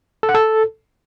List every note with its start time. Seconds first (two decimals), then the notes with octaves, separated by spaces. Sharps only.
0.23 A4
0.29 F#5
0.34 A4